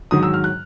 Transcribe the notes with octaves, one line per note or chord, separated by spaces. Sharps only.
G#2 D#3 F#3 D#6
E6
F6
F#6